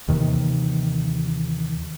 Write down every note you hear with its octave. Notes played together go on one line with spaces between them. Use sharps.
D#2 C3 D#3 E3